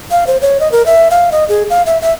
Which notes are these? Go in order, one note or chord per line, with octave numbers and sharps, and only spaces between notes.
F5
C5
C#5
D#5
A#4
E5
F5
D#5
G#4
F5
E5
E5